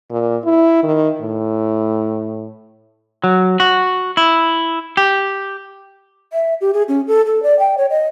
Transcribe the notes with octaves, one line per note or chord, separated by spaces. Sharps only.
A#2
E4
D#3
A2
F#3
F#4
E4
G4
E5
G4
G#4
C#4
A4
A4
D5
G5
C#5
D#5